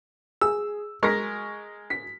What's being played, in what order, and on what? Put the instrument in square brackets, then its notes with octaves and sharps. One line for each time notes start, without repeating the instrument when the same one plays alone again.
[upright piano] G#4 [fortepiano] E6
[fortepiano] G#3 A#4 [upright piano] C#6 A#6 B6
[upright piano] B6